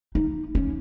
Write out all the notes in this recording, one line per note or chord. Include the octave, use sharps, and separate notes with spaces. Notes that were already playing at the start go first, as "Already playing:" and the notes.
D#4
C#4